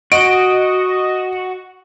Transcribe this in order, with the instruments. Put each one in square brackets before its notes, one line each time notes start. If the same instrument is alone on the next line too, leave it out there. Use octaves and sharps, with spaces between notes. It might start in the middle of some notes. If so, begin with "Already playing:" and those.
[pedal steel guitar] F#4 [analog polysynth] D#5 [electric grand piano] D7